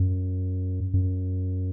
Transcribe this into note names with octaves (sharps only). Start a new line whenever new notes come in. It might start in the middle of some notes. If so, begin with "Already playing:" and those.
Already playing: F#2
F#2